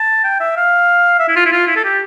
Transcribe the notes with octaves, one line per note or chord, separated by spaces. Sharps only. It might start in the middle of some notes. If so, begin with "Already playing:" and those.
Already playing: A5
G5
E5
F5
E5
E4
F4
E4
F4
E4
A4
G4